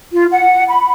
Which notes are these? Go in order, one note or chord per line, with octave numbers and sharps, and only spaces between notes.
F4
F#5
B5